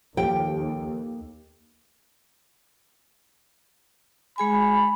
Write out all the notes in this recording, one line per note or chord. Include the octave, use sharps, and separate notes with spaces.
D#2 F3 A#3 G4 A4 G5
G#3 G#4 G#5 B5